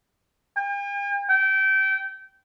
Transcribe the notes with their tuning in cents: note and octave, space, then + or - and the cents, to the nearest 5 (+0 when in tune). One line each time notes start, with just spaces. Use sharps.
G5 +45
G5 -25